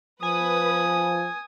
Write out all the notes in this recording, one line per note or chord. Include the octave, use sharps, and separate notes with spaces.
F3 B4 G#5 D#6